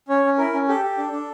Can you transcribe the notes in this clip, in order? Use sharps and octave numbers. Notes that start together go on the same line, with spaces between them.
C#4 C#5
C#4
E4 A#4
C#4
G4 A4
G4
D4
D4